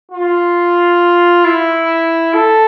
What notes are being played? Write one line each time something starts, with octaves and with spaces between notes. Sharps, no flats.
F4
E4
A4